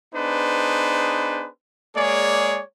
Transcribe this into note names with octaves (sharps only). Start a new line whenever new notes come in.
B3 D4 D#4 G#4 B4 C5
G#3 A#3 G#4 C#5 D5